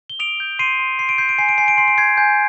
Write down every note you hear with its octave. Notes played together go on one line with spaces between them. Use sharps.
G7
D#6 D7 F7
G6
C6 C7 D#7
C6
C6 C7
D7
G6 C7
D7
G#5 C7
D7
G#5 C7
D7
C6 C7
D7
G6 G#6 C7
G#5 G6